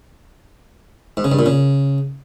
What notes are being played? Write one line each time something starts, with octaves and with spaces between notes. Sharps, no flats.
G#2
C#3
G2
A#2
C#3